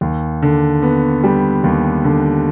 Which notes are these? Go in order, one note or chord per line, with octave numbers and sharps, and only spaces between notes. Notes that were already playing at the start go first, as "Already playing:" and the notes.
D#2
D3
B3
G3
D#2
D3